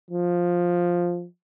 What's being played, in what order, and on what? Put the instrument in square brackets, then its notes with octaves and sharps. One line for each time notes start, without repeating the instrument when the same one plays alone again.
[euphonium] F3